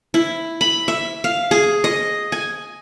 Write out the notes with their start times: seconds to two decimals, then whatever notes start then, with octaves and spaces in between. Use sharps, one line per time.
0.14 E4
0.61 B5
0.88 E5
1.24 F5
1.51 G#4
1.84 D#5
2.32 G#5